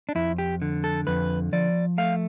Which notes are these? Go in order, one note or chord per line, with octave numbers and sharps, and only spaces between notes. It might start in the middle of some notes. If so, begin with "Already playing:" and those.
D4
F2 E4
G4
D3
A4
F2 B4
F3 D5
A3 F5